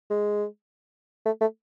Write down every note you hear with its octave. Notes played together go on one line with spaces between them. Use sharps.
G#3
A3
A3